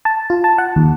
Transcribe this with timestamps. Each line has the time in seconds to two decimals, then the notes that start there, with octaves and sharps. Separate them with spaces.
0.05 A5
0.30 F4
0.44 A5
0.58 F#5
0.76 D#2